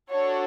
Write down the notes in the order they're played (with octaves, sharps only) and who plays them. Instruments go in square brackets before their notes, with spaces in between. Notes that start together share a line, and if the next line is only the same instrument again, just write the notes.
[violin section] D4 F#4 A4 C#5